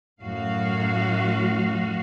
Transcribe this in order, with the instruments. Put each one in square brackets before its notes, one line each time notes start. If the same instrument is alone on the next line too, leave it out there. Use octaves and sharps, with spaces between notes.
[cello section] F#2 A2 F#4 F5